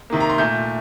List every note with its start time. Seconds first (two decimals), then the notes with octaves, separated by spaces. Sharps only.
0.10 C3 D#3 A#3
0.20 A#5
0.29 C6
0.38 A#2 A3 G6